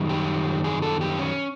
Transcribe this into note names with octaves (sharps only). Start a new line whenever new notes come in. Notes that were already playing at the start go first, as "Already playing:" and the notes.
Already playing: F#2 D#3 G3
G4
G#4
A4
G4
C#4